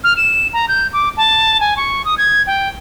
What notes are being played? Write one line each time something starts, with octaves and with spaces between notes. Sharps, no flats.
F6
E7
A#5
G6
D6
A5
G#5
C#6
D#6
G#6
G5